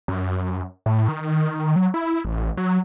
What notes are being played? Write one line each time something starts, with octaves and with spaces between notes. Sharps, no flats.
F#2
A2
D#3
F#3
E4
A1
F#3